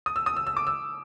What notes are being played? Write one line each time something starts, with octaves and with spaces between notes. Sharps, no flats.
D#6
E6
D#6
E6
E6
D6
E6